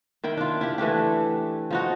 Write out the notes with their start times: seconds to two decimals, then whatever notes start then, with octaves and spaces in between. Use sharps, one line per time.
0.24 D#3 E4 G5
0.37 D4 F4
0.61 E4 G4
0.78 E3 A3 D4 G4
1.71 F3 D#4 F#4